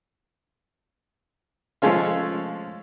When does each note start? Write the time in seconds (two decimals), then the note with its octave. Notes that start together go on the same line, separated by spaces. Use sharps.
1.82 F3 G#3 A3 C#4 F4